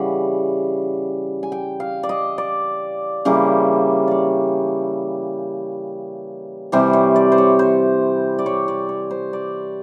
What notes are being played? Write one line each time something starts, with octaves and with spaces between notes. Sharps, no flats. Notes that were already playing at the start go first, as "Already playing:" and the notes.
Already playing: C#3 E3 G3 F#5
G#5
G5
F5
D5
D#5
D5
C#3 E3 G3 A#3
C#5 D5
C3 E3 G3 C5
C#5
D5
C5
C#5
C5
D5
C#5
D5
C#5
C5
D5